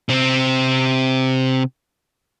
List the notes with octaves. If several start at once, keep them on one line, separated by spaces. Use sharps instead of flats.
C3 C4